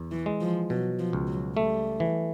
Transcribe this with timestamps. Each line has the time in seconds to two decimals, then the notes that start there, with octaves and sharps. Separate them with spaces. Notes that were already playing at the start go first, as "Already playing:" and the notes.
Already playing: E2
0.11 E3
0.26 G#3
0.41 F3
0.70 B2 F#3
0.99 F3
1.13 C#2
1.27 F#3
1.57 G3 A3
2.00 E3